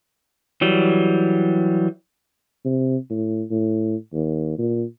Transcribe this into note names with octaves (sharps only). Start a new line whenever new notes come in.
E3 F#3 G3
C3
A2
A2
D#2
A#2